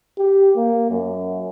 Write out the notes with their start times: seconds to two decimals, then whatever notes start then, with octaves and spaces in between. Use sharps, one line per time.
0.18 G4
0.56 A#3
0.90 F#2